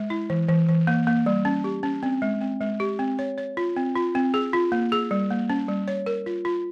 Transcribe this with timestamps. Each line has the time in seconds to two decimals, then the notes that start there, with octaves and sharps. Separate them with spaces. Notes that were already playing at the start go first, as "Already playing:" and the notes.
Already playing: G#3
0.10 E4
0.30 E3
0.49 E3
0.69 E3
0.87 A#3
1.07 A#3
1.26 G3
1.45 C#4
1.64 G4
1.83 C#4
2.03 C4
2.22 G#3
2.41 C4
2.61 G#3
2.80 G4
2.99 C4
3.19 C#5
3.38 C#5
3.57 F4
3.77 C4
3.95 F4
4.15 C4
4.34 G#4
4.53 F4
4.72 A#3
4.92 G#4
5.11 G3
5.30 A#3
5.50 C#4
5.68 G3
5.88 C#5
6.06 A#4
6.26 F4
6.45 F4